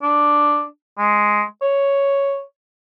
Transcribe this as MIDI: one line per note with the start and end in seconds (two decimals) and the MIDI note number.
0.02 0.63 62
0.98 1.42 56
1.62 2.41 73